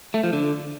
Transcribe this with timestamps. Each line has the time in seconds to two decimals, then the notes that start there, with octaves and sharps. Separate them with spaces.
0.14 A3
0.24 F3
0.33 D3